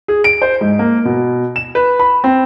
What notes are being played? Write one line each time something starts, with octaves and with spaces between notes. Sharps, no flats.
G#4
D7
C5
G#2
A#3
B2
E7
B4
B5
C4